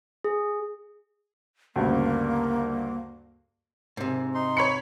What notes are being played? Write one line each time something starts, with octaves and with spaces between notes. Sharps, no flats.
G#4
D2 G2 C#3 A#3
G#2 C3
D#4 C6
C#5 B5 C#7